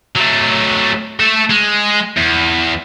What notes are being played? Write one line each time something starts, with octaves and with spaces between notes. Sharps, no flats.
F#3 A3
A3 A4
G#3
E2